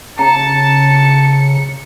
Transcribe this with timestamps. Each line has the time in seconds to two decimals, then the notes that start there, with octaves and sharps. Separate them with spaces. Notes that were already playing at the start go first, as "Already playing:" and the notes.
0.19 C#3 A5 A#5 C#7